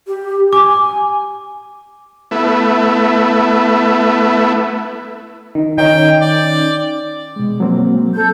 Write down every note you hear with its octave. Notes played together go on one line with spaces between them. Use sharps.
G4
G#5 D6
A3 B3 E4
D#3
D#3 C#4 G5
D5
B2 G#3
F#3 A#3 C4
A4 G6